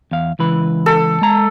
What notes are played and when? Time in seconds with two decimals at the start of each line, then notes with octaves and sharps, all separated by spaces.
0.11 E2 F5
0.39 C#2 E3 B4
0.86 A4
1.22 G#3 A#5